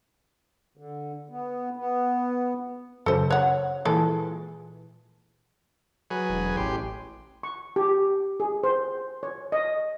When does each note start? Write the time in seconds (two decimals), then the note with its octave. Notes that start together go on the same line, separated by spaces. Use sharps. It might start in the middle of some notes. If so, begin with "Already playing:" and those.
0.77 D3
1.30 B3
1.77 B3
3.06 F#2 C#3 A4 C5
3.30 C#5 F#5
3.85 A#2 E3 G#3 A4
6.10 F#3 G#4 B4
6.29 E1
6.57 A1 G4 C6
7.43 C#6
7.76 G4
8.40 G#4
8.64 C5
9.23 C#5
9.52 D#5